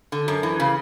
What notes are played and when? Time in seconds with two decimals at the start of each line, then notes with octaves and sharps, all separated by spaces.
0.12 D3
0.28 F#2
0.43 E3
0.60 C#3